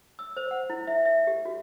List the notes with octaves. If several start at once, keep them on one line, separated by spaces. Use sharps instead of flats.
E6
C5
F#5
E4
E5
E5
G4
F#4